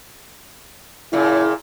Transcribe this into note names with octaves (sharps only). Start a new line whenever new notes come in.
A#2 C#3 E4